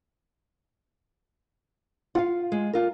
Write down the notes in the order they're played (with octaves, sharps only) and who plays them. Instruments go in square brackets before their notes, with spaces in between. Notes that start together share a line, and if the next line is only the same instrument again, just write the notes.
[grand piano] F4 [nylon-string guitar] F5 F#5
[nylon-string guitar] G#3
F4 A#4